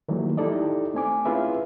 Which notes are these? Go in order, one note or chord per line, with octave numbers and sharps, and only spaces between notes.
D#3 E3 F#3 G3 A3 A#3
D#4 E4 G4 A4 D5 D#5
A3 C4 G#5 D6
C#4 E4 F4 G#4 B4 E5